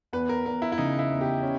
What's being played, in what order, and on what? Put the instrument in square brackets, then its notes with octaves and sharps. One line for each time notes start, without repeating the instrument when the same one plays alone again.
[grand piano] E2 [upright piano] B4
[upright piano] A#4
[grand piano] E2 [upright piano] A#4
[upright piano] E4
E4
[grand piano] C#3 [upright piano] D#4
[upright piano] E4
[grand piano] E2
[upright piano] G4
[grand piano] C#4